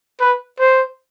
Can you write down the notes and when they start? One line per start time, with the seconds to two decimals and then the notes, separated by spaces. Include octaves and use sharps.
0.20 B4
0.59 C5